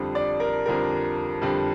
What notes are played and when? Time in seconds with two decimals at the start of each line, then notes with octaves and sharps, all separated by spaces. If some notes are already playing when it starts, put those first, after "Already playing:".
Already playing: F2 D3 G3
0.15 D5
0.40 A#4
0.66 F2 D3 G3 A#4
1.42 F2 D3 G3